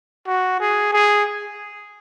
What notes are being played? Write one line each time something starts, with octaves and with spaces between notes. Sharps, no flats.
F#4
G#4
G#4